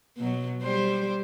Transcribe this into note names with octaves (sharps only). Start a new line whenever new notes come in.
B2 F#3
G3 C5